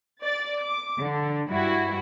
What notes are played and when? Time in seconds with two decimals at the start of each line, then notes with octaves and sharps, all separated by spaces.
0.24 D5 A6
0.61 D6
1.02 D3
1.51 G2 G3 E4 F#4